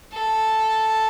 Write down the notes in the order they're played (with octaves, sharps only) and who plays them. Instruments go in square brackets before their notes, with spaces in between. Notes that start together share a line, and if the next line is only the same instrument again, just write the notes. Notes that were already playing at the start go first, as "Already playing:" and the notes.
[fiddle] A4